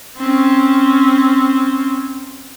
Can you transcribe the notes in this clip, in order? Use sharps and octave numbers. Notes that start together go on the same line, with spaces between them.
C4 C#4